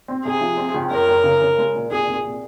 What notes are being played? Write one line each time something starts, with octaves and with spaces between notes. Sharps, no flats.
C4
C3 G#4
F3
C4
C#2
F#2 A#4
F#2
C#3
C#3
G#3
A#2
C2 G#4
C2
A#2